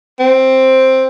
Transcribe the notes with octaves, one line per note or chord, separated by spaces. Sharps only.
C4